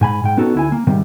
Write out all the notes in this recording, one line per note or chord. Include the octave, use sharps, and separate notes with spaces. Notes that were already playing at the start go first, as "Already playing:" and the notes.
G#2 G#5 B5
G#2 G5
B3 C#4 D#4 F#4 A4
D2 E4 G#5
A#3
G#2 C3 D#3 G3